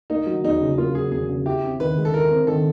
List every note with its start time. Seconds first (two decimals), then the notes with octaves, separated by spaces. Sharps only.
0.10 A#3 D#4
0.27 F#3
0.44 E2 D#4
0.61 C#3
0.78 A#3 F4
0.95 F#3 G#4
1.11 E2 G#4
1.29 C#3
1.46 E4 G4
1.63 C4
1.80 D#3 B4
1.97 G#3
2.05 A4
2.14 E4 A#4
2.31 C4
2.47 D#3 A4